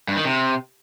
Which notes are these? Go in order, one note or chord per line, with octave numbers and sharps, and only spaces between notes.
G2
D#3
C3